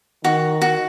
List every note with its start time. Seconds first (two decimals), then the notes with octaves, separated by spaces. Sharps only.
0.24 D#3 F#4
0.62 F#4